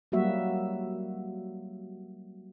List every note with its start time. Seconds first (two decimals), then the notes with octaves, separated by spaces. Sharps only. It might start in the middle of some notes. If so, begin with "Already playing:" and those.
0.12 F#3 G3 A#3 F#4 E5